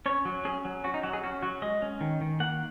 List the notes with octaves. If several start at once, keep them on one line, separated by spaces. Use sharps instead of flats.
C#4 C#5
F#3
C#4 G#4
F#3
C#4 F#4
D#4
F#3 F#4
G#4
C#4 F#4
F#3 F#4
G#3 D#5
C#4
D#3
D#3
A#3 F#5